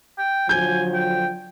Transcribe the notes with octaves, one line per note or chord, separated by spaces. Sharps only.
G5
D3 F3 F#3 G#5 G6
G5